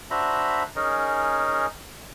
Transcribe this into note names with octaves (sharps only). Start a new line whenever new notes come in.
D4 F#4 C5 E5 A#5 B5
C#4 D#4 G#4 A#4